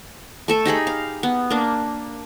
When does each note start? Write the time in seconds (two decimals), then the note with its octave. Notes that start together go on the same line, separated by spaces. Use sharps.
0.48 A3 A4 E5
0.65 D#4 G4 G#4 B5
0.87 F5
1.23 B3
1.50 A#3 D4